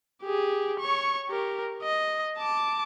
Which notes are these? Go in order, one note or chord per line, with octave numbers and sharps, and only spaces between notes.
G4 G#4
C#5 C#6
G4 A#4
D#5
A5 D6